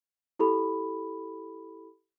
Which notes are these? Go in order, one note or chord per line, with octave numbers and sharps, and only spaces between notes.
E4 G4 A4 B5